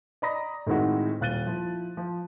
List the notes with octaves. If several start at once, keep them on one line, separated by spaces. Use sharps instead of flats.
D5 D#5 A#5 B5 D#6 A#6
A2 D#3 G#3 C4 E4 F#4
D#1 F5 F#6 A6 D#7 G7
F3 E4
F3